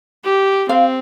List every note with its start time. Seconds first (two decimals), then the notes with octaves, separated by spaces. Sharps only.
0.24 G4
0.69 C4 F5